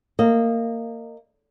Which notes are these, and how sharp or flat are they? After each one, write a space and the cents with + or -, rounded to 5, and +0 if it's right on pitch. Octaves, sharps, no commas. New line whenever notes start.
A#3 -20 D#5 -15